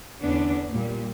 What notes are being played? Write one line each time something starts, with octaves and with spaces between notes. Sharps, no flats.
E2 D3 B3 C#4 D4
A#2 G3